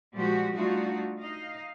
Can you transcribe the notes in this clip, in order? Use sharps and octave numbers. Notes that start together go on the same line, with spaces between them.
A#2 F3 G3 G#3 F#4 G4
G3 A3 D4 D#4 F4 F#4
D#4 D#5 F5